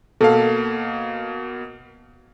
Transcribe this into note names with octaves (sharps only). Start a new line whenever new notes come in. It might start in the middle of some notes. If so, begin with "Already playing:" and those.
B2 A#3 A4 F5